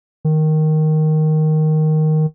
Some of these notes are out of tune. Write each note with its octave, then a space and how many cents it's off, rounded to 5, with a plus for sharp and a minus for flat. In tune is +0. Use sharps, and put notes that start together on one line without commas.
D#3 +0